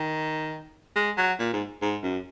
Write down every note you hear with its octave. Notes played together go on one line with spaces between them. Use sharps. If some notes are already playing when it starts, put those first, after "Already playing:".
Already playing: D#3
G#3
F#3
A#2
G#2
G#2
F#2